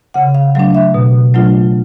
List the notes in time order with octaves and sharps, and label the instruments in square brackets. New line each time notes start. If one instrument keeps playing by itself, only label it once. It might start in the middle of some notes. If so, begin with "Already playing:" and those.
[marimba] C#3 F#5
F5
F#3 A3 D4 F5
E5
B2
F#3 A3 D4 F4